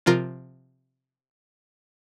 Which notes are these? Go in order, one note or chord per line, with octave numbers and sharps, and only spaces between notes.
C3 F3 F4 A#4